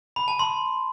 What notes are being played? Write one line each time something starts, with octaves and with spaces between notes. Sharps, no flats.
B5
A5
C6